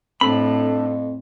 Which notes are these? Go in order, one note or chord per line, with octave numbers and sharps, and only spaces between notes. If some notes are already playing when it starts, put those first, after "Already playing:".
F2 A2 C4 D4 A4 B5